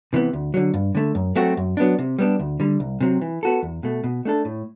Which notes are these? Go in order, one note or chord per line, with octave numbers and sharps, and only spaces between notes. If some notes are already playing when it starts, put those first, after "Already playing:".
C3 E3 B3
D2
D3 F#3
G2
D3 A3
F#2
F#3 A3 C4 F#4
F#2
F#3 B3 D4
C3
G3 B3 D4
D2
D3 G3
C2
C3 F#3 C4
E3
B3 F#4 A4
E2
B2 A3
B2
A3 D4 A4
A2